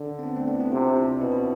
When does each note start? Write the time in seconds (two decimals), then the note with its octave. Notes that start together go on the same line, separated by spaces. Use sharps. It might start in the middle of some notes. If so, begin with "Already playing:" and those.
Already playing: D3
0.19 C4
0.23 B3 D4
0.36 A3 C4
0.48 B3 D4
0.55 E4
0.60 B3 D4
0.72 C3 D4 F4
0.87 D4
0.96 C4 E4
1.20 B2 C4 E4
1.32 E4